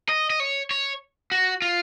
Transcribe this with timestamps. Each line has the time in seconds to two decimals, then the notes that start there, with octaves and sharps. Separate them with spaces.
0.09 D#5
0.30 D#5
0.40 C#5
0.71 C#5
1.32 F#4
1.62 F4